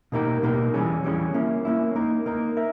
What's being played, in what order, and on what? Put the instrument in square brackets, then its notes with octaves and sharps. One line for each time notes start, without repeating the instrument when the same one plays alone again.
[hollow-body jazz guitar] B2 A#3 D#4 G4 A#4
B2 A#3 D#4 G4 A#4
E3 G3 C#4 G#4
E3 G3 C#4 G#4
A#3 C#4 E4
A#3 C#4 E4
A#3 D#4 A#4
A#3 D#4 A#4
A#4 E5